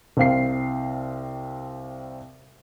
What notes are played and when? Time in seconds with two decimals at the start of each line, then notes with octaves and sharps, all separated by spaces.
0.17 C2 C4 F5 C7